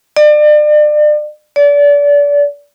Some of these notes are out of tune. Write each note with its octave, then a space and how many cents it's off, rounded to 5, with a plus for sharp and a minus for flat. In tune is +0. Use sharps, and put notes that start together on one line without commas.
D5 +35
D5 -30